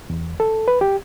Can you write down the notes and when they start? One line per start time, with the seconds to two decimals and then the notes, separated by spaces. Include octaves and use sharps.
0.10 E2
0.40 A4
0.68 B4
0.81 G4